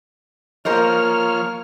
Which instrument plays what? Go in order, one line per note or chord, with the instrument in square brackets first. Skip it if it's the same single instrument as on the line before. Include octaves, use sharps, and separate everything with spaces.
[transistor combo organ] F3 C#5 F6 [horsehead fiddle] A#3 [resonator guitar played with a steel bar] A#4 C5 D#5